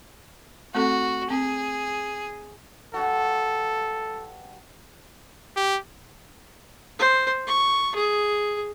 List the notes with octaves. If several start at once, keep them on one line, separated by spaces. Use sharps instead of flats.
A3 C4 F#4 A4
C4 G#4
G2 F#4 A4
G4
C5
C#6
G#4